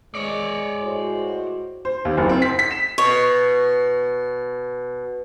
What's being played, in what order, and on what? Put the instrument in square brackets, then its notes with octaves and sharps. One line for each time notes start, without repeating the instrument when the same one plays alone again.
[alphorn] G#3 [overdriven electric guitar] C#5 D5
[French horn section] A2 F#4 C5
[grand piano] C5
D#2
F#1
C4
B6
B6
E7
[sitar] B2 [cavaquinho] C#5